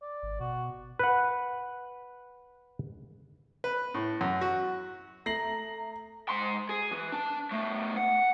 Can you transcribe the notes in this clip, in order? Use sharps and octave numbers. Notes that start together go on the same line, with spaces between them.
D5
G#1
B2 F#4
B4 F#5
B4
A2
F#2
F#4
A3 A#5 A#6 C7 F#7
G#2 C6
G#4
E3
D4
B2 A3
F#5